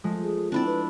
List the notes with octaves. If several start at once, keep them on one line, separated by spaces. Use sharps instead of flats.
F3 G#3 A3
G#4
C4 D4 E4 D5
B4